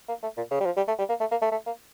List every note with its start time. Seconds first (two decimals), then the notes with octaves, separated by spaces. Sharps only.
0.09 A#3
0.23 A3
0.37 A#2
0.51 C#3
0.60 G3
0.66 F3
0.77 G3
0.88 A3
0.99 G3
1.09 A#3
1.20 A3
1.31 A#3
1.42 A3
1.52 A3
1.67 A#3